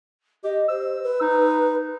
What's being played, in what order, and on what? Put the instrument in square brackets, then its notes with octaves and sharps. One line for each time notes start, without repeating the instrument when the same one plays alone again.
[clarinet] G4 [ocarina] D#5
[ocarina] C5 [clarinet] E6
[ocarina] B4
[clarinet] D#4